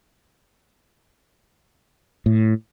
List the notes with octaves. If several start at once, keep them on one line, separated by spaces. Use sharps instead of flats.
A2